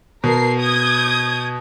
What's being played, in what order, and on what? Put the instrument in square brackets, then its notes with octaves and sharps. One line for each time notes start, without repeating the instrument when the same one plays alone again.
[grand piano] B2 [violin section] A#4 C7
[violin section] D#6 G6 G#6